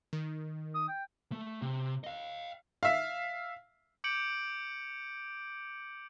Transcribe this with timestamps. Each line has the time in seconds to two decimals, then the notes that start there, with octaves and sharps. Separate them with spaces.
0.13 D#3
0.74 D#6
0.88 G5
1.32 A3
1.62 C3
2.04 D#5 F5
2.83 E5 F5
4.04 D6 G6 C#7 D7 F#7